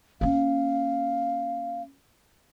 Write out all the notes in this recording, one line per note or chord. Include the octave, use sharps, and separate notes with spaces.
A#3 C#4 F5